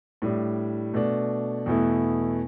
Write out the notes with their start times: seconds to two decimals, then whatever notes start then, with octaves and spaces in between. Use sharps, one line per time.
0.22 A2 G3 D4
0.94 B2 A3 D4
1.66 E2 B2 A3 E4